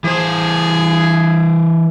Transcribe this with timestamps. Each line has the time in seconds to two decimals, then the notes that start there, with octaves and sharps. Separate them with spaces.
0.04 E3 G#4 C5